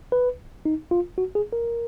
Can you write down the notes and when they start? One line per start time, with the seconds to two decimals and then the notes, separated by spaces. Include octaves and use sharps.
0.12 B4
0.65 D#4
0.91 F4
1.18 F#4
1.35 G#4
1.53 A#4